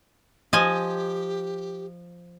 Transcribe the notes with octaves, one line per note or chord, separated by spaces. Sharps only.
F3 G4 D#5 G#5